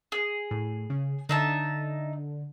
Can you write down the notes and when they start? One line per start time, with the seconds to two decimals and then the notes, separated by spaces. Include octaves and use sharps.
0.12 G#4
0.51 A2
0.90 C#3
1.29 D3 D#4 E5 A5